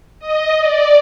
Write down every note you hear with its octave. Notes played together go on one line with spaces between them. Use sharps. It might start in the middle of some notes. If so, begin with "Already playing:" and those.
D#5
D5